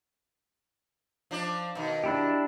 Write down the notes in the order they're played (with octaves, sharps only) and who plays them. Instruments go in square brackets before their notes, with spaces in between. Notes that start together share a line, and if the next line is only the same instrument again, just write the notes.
[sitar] F3 D4 C5
B2 D#3
[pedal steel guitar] D4 E4 G4